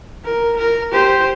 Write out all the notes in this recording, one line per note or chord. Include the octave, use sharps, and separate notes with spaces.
A#4
A#4
G4 C5